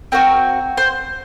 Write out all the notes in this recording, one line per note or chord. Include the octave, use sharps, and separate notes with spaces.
C4 F#4 A#4
C5